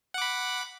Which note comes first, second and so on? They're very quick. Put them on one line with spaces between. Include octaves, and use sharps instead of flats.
F#5 D6 B5